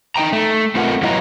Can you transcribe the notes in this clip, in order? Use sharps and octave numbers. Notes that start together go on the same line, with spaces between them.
D#4 G4 G5 A#5
A3
A3 C4 F4 A#4 B4 F#5
F#3 E4 B4 D#5 F5 A#5